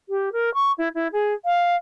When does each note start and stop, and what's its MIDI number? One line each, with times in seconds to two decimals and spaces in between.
0.09 0.29 67
0.33 0.53 70
0.54 0.72 85
0.78 0.89 64
0.95 1.08 64
1.13 1.34 68
1.45 1.76 77